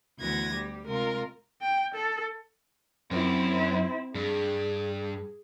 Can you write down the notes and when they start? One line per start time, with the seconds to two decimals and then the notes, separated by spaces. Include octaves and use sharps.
0.19 D2 E3 B3 F#4 G#6 A#6
0.53 G3 G4
0.87 C3 G#3 F4 A#4
1.61 G5
1.94 A4
3.11 F#2 C4 E4
4.15 G2 G#4